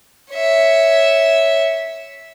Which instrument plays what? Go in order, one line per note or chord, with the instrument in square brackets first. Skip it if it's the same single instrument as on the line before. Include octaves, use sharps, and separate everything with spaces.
[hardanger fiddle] C#5 E5